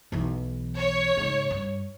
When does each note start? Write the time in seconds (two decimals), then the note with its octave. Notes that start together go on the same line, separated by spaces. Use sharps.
0.12 B1 E3
0.78 C#5
1.17 G#2 C#3
1.51 G2